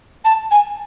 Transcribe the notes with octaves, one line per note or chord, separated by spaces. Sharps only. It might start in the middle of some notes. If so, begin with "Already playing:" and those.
A5
G#5